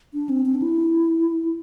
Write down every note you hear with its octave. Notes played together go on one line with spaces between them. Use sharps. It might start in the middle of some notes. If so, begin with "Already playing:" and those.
D4
C4
C4
D4
E4